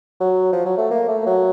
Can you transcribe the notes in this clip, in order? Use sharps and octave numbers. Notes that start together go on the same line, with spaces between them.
F#3
F3
F#3
A3
A#3
A3
F#3